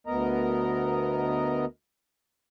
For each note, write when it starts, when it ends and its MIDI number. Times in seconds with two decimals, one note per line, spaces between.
0.07 1.65 38
0.07 1.65 59
0.07 1.65 70
0.07 1.65 75
0.07 1.65 82